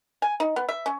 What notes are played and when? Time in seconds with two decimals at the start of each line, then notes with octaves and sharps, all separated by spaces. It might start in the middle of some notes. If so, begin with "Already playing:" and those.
0.22 G#5
0.40 D#4
0.56 B3
0.69 E5
0.86 C#4